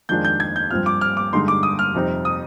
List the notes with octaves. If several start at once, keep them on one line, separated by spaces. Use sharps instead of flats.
F2 D#3 G#3 D4 F4 G6
G6
G#6
G6
G2 F3 C4 F4 F6
D6
F6
D6
G2 D3 G#3 D#4 C6
D6
D#6
F6
F2 C3 G3 C4 D#4
D#6